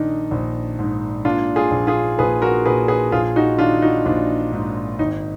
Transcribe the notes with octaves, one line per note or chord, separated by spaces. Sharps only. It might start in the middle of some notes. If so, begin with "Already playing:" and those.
Already playing: A#1 D#3 D4 D#4
A#1
G#2
A#2 D4 F4
F4 G#4
A#1
F4 G#4
A#1 G#4 B4
F#4 A#4
A#2 G#4 B4
G#4 B4
A#1 F4 G#4
D#4 F#4
D#3 D4 F4
D#4 F#4
A#1 D4 F4
G#2
G#1 D#4